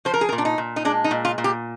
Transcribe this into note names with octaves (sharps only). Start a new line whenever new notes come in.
F3 C5
A#4
G#4
A#4
A#2
D4
D#4
A#2
D#4
G#3 D4
D#4
A#2
F4
A#2
G4